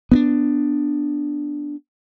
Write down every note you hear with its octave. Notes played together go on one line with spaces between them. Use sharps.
B3 C4 D4